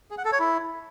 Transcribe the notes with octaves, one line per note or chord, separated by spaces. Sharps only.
G#4
F#5
A4
C#5
E4